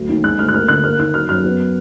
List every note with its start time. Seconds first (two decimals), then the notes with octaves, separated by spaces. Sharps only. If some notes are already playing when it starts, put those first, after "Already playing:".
Already playing: D2 F#3
0.09 D#2
0.24 G#3 F#6
0.39 D2 F6
0.48 F#6
0.54 A#3 F6
0.68 D3 F#6
0.84 A#3 F6
0.99 D#2 F#6
1.14 F#3 F6
1.29 F#2 F6
1.44 B3